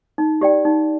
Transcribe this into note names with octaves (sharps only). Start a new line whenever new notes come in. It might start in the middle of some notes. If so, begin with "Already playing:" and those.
D#4
G4 D5 G5
D#4